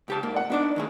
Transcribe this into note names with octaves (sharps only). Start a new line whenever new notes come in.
C#2 G4 A5
G#2 A#3
D5 F#5
B3 D4 D#4 D5
D#2 A2 G#4